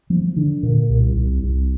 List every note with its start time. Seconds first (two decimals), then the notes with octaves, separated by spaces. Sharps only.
0.10 F3
0.36 D3
0.63 A#2
0.89 C2
1.15 C2
1.42 C2